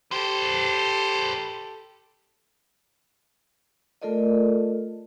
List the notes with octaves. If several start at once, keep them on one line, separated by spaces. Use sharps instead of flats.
G4 A4 B4 C5
A3 F4 A4 A#4 D5 D#5